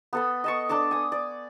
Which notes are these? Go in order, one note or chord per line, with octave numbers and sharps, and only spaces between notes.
B3 A4 B5
D#5 A5 C#6
D4 A4 A5 D6
G#5 D#6
D5